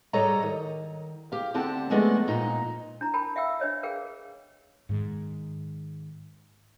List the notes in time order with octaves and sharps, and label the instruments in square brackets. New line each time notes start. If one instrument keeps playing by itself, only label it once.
[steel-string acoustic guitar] G#2 G3 A4 C#5 D#5 A#5
D#3
G4 F5
D2 D3 C4 G4 F#5 A5
F3 G#3 A3 B3 D4 D#5
F2 A#2 D#4
[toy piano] D4 E4 A#5
A#4 G5 A5 B5
E5 F5 G5 E6
D4 B4 C#5 D#5
G#4 A#4 B4 F5 G5
[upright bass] G#2 D#3